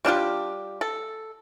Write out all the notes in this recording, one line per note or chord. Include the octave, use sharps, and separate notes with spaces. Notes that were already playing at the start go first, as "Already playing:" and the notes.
G3 D4 F4 G4
A4